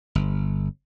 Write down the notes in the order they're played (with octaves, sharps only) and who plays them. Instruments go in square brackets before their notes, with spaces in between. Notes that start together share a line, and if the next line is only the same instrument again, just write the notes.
[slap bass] G1